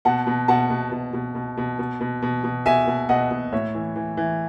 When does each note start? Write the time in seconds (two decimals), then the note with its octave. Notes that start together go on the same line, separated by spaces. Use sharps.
0.05 B2 F#5 A5
0.27 B2
0.48 B2 F#5 A5
0.70 B2
0.92 B2
1.13 B2
1.35 B2
1.57 B2
1.79 B2
2.01 B2
2.22 B2
2.44 B2
2.66 B2 E5 G#5
2.87 B2
3.09 B2 D#5 F#5
3.31 B2
3.53 A2 C#5 E5
3.75 E3
3.96 E3
4.17 E3